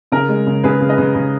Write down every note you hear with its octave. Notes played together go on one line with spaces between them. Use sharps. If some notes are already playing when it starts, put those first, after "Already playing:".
C#3 A#4
G#3
C#3
C#3 G#4 B4
C#3
B4 D#5
C#3
C#3